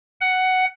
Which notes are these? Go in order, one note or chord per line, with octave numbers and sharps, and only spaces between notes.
F#5